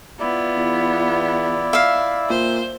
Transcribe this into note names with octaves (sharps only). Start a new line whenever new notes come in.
B3 E4 F4 D5
E2
E5 F5
A#2 C5